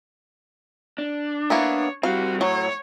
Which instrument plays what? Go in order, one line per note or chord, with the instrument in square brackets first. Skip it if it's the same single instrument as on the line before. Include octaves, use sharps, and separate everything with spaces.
[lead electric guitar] D4
[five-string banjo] A#3 B3 E4 [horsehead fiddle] C#5
[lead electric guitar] G3 C4 [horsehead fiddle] F#4 [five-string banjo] F5
[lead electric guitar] A2 [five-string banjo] F#3 [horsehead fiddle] C#5